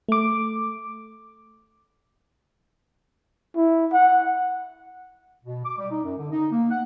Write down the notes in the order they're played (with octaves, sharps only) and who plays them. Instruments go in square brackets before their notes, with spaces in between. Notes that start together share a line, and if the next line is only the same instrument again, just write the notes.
[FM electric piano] A3 D6
[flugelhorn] E4
F#5
[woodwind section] B2
D6
G3
D#4
F#2
D3
D#4
A#3
F#5